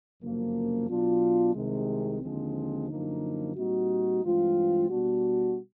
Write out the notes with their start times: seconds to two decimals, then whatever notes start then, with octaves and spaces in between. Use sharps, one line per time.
0.21 G1 F#2 C#3 F3 A#3
0.88 B2 F#3 B3 D4 F4
1.54 C2 C3 D#3 G#3
2.21 D#2 D3 F3 G#3 C4
2.89 F#2 D3 F3 A#3 D#4
3.56 A#2 G3 C4 D#4 F#4
4.23 G2 E3 G#3 C4 F4
4.89 B2 G3 B3 D4 F#4